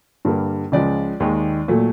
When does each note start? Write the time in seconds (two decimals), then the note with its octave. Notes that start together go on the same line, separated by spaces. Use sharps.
0.25 G2 D3 G3 A#3
0.72 C#2 C#3 F3 G#3 D5
1.20 D#2 D#3 G#3
1.68 A#2 F#3 A3